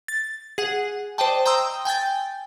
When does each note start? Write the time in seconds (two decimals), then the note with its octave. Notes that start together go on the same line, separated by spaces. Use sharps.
0.08 A6
0.58 G#4 F#5
1.18 C5 D5 D#5 G5 A5
1.46 G5 A#5 C6 D#6 E6
1.85 G5 G#5 G6 A6